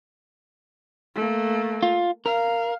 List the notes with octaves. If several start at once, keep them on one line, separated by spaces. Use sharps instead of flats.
A3 A#3
F4
A#4 F5